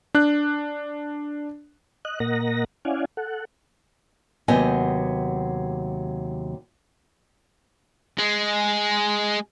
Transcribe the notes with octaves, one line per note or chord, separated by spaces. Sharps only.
D4 F#6
D#5 F#6
A#2 A#3 A#4 D#5 F#5 A#6
C#4 E4 D5 F5 F#5 G#5
A4 F#5
D#2 C3 F#3 B3 D#5 G#5
G#3